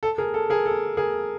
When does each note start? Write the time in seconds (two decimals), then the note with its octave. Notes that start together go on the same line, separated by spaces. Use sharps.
0.03 A4
0.18 G#4 A#4
0.34 A4
0.50 G#4 A#4
0.66 A4
0.97 G#4 A#4